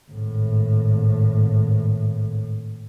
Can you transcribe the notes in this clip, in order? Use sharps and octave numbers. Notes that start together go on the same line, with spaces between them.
G#1 A2